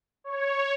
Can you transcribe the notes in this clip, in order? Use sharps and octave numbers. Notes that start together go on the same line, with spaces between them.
C#5